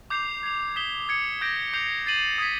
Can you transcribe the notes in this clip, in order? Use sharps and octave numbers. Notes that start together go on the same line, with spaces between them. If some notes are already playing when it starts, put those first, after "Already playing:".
D6 G6 C7 F7
G#6 C7 F7
D#6 G6 B6 E7 G7
D#6 G#6 C#7 F7
D6 G6 A#6 D7
D6 G6 C7 F7
A6 C7 D#7 F#7
D#6 G#6 B6